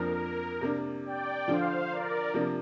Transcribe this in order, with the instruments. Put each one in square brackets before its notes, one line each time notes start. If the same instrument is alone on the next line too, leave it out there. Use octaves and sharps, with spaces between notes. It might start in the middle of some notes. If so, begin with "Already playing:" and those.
Already playing: [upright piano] F2 F3 A#3 D4 [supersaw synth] A#4
[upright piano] C3 A#3 D4
[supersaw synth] D5 G5
[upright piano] D3 F3 D4 [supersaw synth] C5 F5
[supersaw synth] A#4 D5
[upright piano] C3 F3 A#3 D4